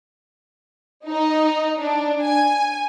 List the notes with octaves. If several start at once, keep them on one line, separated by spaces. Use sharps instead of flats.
D#4
D4
G#5